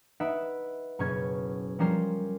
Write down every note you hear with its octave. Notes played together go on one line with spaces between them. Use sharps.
D#4 B4 E5 F#5 D7
F#1 B2 C#4 C#6 F6 G#6
F3 G3 C#4 A#4 C5 E7